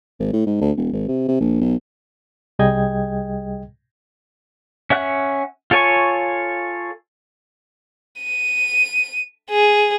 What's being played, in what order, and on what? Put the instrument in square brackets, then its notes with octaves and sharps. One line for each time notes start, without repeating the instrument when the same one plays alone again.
[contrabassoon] G#1
A2
G#2
D2
E1
G#1
C3
C3
A#1
B1
[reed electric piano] C2 G3 G#4 D#5 G5 G#6
[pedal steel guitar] C#4 E5 F#5 F#6
F4 A4 C#5 G#5 C#6
[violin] D#7
G#4